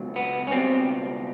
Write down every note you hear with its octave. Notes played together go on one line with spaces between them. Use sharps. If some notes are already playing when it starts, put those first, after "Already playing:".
Already playing: C#2 B2 F#3
B3
C#4
C#2 B2 G3 C4